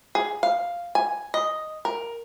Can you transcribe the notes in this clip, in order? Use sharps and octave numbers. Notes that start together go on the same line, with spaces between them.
G#4
F5
G#5
D#5
A#4